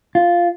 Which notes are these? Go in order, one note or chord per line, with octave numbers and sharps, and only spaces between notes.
F4